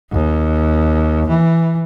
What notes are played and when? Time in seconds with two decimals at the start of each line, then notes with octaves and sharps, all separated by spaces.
0.12 D#2
1.29 E3